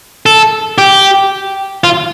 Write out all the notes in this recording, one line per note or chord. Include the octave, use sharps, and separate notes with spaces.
A4
G4
F4